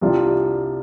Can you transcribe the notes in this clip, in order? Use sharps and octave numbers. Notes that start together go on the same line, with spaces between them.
C2 C3 G3 D4 F4